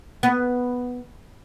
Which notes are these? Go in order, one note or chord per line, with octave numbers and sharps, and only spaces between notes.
B3